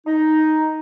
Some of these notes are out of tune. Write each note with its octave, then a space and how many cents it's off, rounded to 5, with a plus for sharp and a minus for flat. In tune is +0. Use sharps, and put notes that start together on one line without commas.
D#4 +5